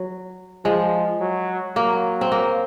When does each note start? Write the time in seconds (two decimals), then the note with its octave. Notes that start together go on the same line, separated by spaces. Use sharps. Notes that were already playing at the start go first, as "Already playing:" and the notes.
Already playing: F#3
0.65 F3 G#3
1.20 F#3
1.76 F#3 A#3
2.21 C4
2.32 A#3